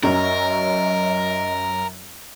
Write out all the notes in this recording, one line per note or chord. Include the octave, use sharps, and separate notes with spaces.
F#2 F#3 C#4 A#4 D#5